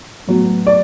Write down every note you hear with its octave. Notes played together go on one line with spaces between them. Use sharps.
A2 F#3 B3
D5